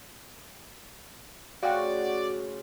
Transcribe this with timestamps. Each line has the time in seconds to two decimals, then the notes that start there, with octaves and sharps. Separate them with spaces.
1.63 C#3 A3 F4 F#4 D5 F5 G5